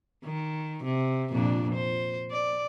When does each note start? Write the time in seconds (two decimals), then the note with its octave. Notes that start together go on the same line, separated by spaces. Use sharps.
0.25 D#3
0.84 C3
1.31 F2 A#2 D4
1.74 C5
2.31 D5